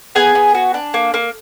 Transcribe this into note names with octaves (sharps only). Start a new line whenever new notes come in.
B3 G#4 G#5
B3
F#4
D4
A#3
A#3